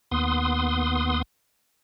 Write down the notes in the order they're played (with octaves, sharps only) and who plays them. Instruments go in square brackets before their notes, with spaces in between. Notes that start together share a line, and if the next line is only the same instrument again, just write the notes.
[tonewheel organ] D#2 B3 C6 D#6